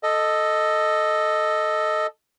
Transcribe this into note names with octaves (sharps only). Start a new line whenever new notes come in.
A4 D#5